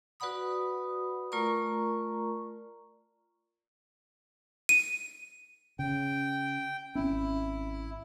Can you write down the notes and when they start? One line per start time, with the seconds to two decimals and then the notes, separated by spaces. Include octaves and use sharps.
0.20 F#4 B4 D5 F#5 B5 D#6
1.32 A3 F4 A#4 D5 A#5 C#6
4.69 D#7
5.79 C#3 G5
6.95 G#1 C4 C#4 E4